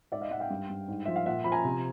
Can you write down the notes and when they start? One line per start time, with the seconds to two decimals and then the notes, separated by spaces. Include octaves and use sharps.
0.12 G#2 D5 E5
0.21 D#5 F5
0.30 G#2 E5 F#5
0.40 F5 G5
0.50 G2
0.70 G2
0.88 G#2
1.06 F3 E5
1.16 F5
1.26 A#2 E5 F#5
1.44 F3 B5
1.52 G#5 A#5
1.65 C3